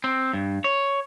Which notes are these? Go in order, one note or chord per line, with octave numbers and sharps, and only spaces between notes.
C4
G2
C#5